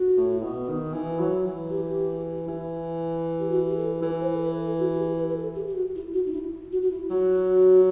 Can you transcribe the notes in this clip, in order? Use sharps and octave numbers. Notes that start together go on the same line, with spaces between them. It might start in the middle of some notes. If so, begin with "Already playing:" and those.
Already playing: F#4
A2
B2
D#3
E3
F#3
E3
G4
E3
G4
F#4
G4
A4
E3 B4
C5
A4
B4
A4
F#4
F#4
G4
B4
B4
A4
G4
G4
F#4
E4
F#4
D#4
E4
F#4
F#4
E4
F#3 F#4